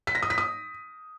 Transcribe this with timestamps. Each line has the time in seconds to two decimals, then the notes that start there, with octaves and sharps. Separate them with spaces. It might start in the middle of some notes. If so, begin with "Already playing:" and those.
0.07 B6
0.15 A#6
0.23 D#6
0.30 B6
0.38 D#6